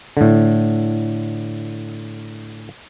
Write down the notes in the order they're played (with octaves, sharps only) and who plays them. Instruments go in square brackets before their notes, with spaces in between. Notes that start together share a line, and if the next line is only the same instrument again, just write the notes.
[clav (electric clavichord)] A2 D3